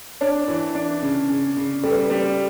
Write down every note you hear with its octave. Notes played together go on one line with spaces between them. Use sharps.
D4 C#5
E3
D4
C#3
C#3
C#3
G3 A4
B4
A4
G3